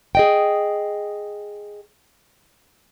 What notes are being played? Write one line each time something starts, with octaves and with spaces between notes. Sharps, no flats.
G#4 D#5 G5